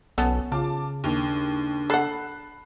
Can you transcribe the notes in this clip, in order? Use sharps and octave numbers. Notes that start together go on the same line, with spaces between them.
B1 B3 C#4 A4
C#3 F4 A5 D6
D#2 D4
A4 F#5 B5 F#6 C7